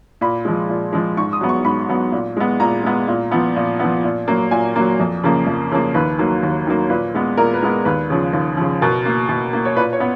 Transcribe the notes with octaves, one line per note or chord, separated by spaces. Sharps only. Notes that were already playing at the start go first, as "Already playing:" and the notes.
A#2 B5
F3 G#3
A#2
F3 G#3
G#2 C#6
D#6
F#3 B3
C#6
G#2 B5
F#3 B3
A#2
G#3 B3
A#2 A#5
G#3 B3
A#2
F3 B3
A#2
F3 B3
A#2
F#3 A#3
A#2 G#5
F#3 A#3
F2
C#3 F3 A#3
F2
C#3 F3 A#3
D#2 B4
D#3 F#3 A#3
D#2
D#3 F#3 A#3
A#2 B4
G#3 B3
A#2 A#4
B4
G#3 B3
D#2 B4
C#3 F3
D#2
C#3 F3
B2 A#4
A#3
B2
A#3
C#5
A#2 B4
C#5
B3